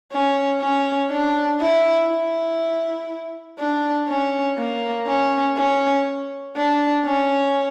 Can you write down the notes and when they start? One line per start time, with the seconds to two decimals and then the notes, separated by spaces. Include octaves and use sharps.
0.12 C#4
0.61 C#4
1.11 D4
1.60 E4
2.10 E4
3.59 D4
4.08 C#4
4.58 A#3
5.07 C#4
5.57 C#4
6.56 D4
7.06 C#4